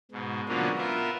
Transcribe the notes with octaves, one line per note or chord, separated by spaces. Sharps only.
G#2 B2
B2 D3 F3 F#3 A#3 C#4
B3 F4 A#4 E5